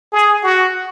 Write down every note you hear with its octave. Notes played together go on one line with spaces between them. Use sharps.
G#4
F#4